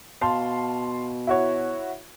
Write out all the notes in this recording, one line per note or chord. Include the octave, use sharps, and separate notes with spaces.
B2 F5 A5 C6
E4 F#4 C#5